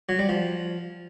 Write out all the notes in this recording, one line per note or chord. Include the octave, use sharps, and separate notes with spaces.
F#3
G3
F3